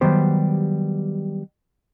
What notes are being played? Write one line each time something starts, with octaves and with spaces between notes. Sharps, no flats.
D#3 F#3 G3 B3 G4 C5